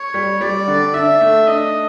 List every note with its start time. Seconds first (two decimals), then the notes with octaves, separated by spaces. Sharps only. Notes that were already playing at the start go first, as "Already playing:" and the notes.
Already playing: C#5
0.14 G3
0.41 G3 D5
0.68 D3
0.94 D4 E5
1.21 A3
1.47 D4 D#5